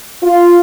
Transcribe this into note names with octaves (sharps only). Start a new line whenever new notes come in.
F4